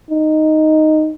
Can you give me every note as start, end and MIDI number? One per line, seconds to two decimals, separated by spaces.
0.10 1.13 63